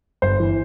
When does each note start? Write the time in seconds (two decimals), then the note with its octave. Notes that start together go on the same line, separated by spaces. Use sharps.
0.22 G1 C5
0.40 E3